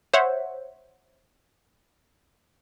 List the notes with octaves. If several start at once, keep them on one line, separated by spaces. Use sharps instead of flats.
C5 C#5 E5 F#5